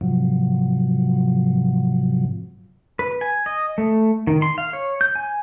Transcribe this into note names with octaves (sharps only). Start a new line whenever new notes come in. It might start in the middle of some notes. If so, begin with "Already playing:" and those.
G#2 C3 F3 F#3
B4
G#5
D#5
A3
D#3
C6
F5
C#5
G6
G#5